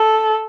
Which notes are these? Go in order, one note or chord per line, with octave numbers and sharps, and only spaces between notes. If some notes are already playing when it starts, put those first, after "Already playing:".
Already playing: A4